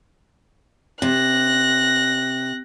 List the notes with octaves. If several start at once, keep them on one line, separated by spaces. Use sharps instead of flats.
C3 F#6 A#6